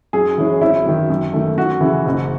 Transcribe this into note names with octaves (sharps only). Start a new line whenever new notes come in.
F#2 G#4
E3 G#3 C#4 E4
G#1 E4
F#2 D#3
F#2
D#3 A3
F#2 F#4
C#3 E3
F#1